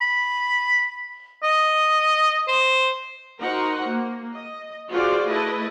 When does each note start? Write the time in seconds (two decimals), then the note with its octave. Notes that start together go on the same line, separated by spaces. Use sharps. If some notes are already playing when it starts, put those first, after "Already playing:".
0.01 B5
1.43 D#5
2.48 C5
3.40 D#4 F#4 A#4 C5 F#5
3.89 A#3
4.33 D#5
4.90 F4 F#4 G#4 C5 D5 F5
5.30 A3 E4 B4 D#5 A5